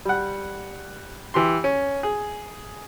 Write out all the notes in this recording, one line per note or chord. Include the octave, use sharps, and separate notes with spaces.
G3 F#5
E3 G4 C6
C#4
G#4